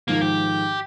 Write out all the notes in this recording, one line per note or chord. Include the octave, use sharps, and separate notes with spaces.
G#2 D#3 F3 A#3
G4